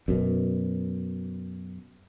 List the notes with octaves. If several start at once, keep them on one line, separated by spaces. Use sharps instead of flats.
F#2 B2